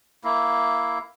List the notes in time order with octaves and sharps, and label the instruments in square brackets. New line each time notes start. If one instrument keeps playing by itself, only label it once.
[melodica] A#3 E4